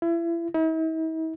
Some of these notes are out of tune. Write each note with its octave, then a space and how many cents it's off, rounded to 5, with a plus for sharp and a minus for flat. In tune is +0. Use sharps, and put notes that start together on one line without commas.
E4 +35
E4 -45